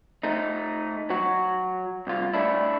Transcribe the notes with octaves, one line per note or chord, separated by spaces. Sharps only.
A3 D#4
F#3 F#4
C2 F4
A3 D4 E4